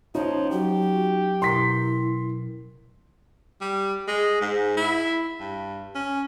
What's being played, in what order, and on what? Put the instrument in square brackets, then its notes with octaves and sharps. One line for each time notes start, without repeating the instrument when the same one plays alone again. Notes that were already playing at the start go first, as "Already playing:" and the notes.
[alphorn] F3 [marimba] C#4 [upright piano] D#4 [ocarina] C#5
[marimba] F#3 [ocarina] F#4 [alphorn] G4
[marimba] B2 A#4 A#5 [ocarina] E4 [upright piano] C6 B6
[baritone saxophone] G3
G#3
G#2
E4
G2
C#4